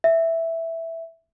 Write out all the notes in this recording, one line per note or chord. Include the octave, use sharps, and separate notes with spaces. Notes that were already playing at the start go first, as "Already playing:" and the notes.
E5